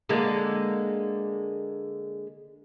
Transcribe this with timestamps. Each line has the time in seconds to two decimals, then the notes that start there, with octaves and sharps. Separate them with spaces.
0.09 D3 G#3 A#3